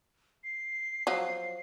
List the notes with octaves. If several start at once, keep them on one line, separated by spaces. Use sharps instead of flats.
C7
F3 F#3